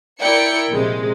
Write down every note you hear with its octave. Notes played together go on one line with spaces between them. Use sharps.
E4 A#4 D5 G5 C#7
A#1 C3 G#3